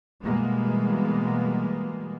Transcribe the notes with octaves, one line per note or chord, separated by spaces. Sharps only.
B2 E3 G3 G#3 A#3 B3